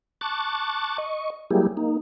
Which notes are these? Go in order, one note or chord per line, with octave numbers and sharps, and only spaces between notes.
A5 C#6 D6 F#6 A6
D#5 C#6
F#3 G3 A#3 E4 G4 G#4
A#3 D#4